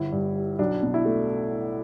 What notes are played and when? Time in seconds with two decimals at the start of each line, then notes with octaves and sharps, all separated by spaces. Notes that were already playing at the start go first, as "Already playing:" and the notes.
Already playing: G1 E4
0.12 G2
0.35 G3
0.59 B1 D4
0.83 B2
0.94 E4
1.05 A3